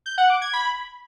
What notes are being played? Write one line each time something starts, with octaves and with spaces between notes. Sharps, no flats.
G6
F#5
D6
G#6
B5